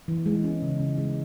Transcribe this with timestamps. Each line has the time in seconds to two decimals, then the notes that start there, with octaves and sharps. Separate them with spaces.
0.08 E3
0.26 G#3
0.44 C#4
0.62 C#3
0.80 C#3
0.98 G#3